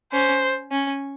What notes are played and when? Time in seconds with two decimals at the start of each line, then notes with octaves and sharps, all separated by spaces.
0.13 C#4 C5
0.71 C#4